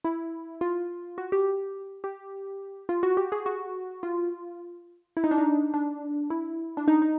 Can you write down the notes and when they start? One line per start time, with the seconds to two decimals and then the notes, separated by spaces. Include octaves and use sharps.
0.04 E4
0.61 F4
1.18 F#4
1.32 G4
2.04 G4
2.89 F4
3.03 F#4
3.17 G4
3.32 G#4
3.46 F#4
4.03 F4
5.17 E4
5.24 D#4
5.31 D4
5.38 D#4
5.74 D4
6.30 E4
6.77 D4
6.88 D#4
7.02 D#4